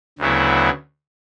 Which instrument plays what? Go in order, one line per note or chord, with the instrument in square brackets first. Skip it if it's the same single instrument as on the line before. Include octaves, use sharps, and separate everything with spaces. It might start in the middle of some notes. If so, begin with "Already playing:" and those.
[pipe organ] D2 C#3 F#3 B3 E4